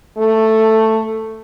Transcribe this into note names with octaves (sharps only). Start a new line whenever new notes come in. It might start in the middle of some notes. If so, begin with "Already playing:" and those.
A3